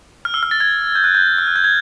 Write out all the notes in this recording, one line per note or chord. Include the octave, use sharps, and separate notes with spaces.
F6
E6
F6
A6
G#6
G6
F#6
G6
F6
F#6
G6
G#6